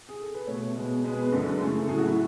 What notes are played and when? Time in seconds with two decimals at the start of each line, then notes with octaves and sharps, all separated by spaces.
0.09 G#4
0.22 A4
0.35 B4
0.47 B2 A3 C#5
0.76 B2 G#3 B3
1.04 B2 G#3 B3 B4
1.13 G#4
1.23 B4
1.32 F#2 D3 G#3 A4
1.60 C#3 E3 A3
1.84 A4
1.88 A2 F#3 A3 G#4
1.98 F#4
2.07 E4